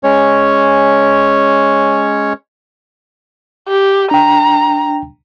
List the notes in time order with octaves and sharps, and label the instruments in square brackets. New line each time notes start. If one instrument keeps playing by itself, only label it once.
[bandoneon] G#3 C#4 C#5
[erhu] G4
[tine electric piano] D4 G5 [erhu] A#5